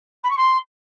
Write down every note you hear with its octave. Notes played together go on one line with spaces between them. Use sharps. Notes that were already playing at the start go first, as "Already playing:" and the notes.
B5
C#6
C6